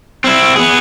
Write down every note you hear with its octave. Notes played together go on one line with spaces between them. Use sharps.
C4 E4
B3 G#4